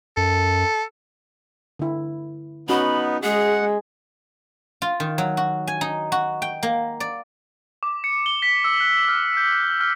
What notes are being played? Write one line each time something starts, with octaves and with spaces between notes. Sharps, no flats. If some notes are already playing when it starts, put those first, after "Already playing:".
F#2 A4
D3 E4
B3 C#4 D#4 F#4 B5
G#3 G#4 F#5
F4
D#3
F#3
F#4
G#5
D#4
F#4
G5
A#3
D5
D6
C#7
G7
B6
E6
F#6
F6
G6
G6
F6